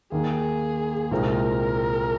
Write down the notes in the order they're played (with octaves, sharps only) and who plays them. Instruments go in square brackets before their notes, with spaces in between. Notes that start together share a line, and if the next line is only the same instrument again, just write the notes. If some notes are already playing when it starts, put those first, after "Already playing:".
[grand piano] D#2 D#3 A#3 [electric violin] G#4
[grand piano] C2 A#2 G#3 C4 D#4 [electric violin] A#4